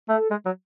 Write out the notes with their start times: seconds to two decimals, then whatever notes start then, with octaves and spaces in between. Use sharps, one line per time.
0.08 A3 A4
0.31 G#3
0.45 F#3